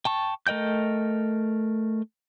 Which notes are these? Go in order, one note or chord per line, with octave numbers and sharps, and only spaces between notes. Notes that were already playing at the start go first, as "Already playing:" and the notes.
G5 A5 C#6
A3 A#4 D#5 G5 G6